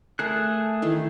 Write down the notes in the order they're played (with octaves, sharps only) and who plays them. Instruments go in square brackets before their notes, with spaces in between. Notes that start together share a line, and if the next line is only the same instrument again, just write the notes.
[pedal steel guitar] A3 G#4 F#6 [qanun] A#4
[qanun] D#3 E3 A3